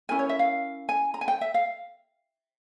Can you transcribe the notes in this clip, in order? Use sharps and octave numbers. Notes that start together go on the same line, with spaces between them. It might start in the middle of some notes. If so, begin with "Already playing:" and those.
C#4 E4 A#4 G#5
C#5
E5
F5
G#5
A#5
G#5
G5
E5
F5